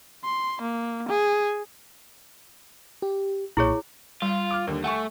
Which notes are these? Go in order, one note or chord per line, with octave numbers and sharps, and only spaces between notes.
C6
A#3
G#4
G4
B1 A#2 E4 G#4 C#5 C#6
G3 F4
D6 F6
D#2 D3
A3 F#5 G#5 C#6